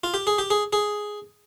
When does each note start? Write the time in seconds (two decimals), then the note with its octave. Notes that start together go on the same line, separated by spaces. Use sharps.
0.04 F4
0.14 G4
0.27 G#4
0.38 G4
0.50 G#4
0.73 G#4